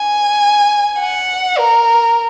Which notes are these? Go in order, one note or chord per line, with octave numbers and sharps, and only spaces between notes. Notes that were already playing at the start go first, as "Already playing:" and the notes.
Already playing: G#5
F#5
A#4